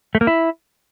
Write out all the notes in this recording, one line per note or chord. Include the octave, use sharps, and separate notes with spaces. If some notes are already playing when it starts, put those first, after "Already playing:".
A3
A#3
E4